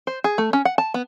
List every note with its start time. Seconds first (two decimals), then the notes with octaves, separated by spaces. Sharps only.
0.07 C5
0.24 G#4
0.38 A3
0.53 C#4
0.65 F#5
0.78 A5
0.94 B3